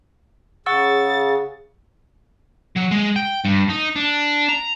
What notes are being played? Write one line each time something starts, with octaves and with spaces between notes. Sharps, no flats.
C#3 G#4 F#5 C#6 E6 A6
F#3
G#3
G5
G2
D#4
D4
A#5